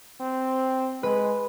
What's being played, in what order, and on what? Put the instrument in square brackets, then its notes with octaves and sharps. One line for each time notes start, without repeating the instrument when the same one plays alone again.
[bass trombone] C4
[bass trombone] G#3 [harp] B4